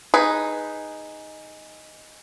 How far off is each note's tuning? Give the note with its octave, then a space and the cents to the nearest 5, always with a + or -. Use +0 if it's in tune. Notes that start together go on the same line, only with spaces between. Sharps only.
D#4 +0 G#4 +0 B4 +0